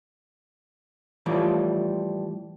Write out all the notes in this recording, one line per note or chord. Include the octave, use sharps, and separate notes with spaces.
A2 E3 F3 G3